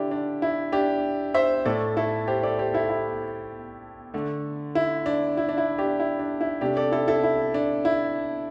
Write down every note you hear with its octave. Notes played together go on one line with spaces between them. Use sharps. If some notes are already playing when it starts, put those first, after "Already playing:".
Already playing: D3 D4 E4 G4
D4
E4
D4 G4
C5 E5
A2 A3 A4 D5
E4 A4
G4 C5
A4 D5
G4 C5
E4 A4
E4
D3 A3
E4
D4
E4
D4
E4
D4 G4
E4
D4
E4
C3 A3 D4 G4
A4 D5
E4 A4
E4 A4
E4
D4
E4